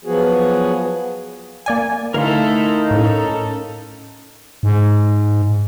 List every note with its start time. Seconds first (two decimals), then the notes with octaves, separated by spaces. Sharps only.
0.05 F3 F#3 B3 F#4 G#4
1.66 A#3 D5 G#5
2.14 D3 A3 D#4 E4 A4 A#4 F5 C6
2.91 A2 C#4 A4
4.63 G#2